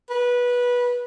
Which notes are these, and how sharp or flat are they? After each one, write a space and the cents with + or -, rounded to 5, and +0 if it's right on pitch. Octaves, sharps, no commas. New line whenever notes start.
B4 -20